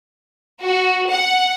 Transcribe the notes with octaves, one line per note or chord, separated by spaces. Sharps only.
F#4
F#5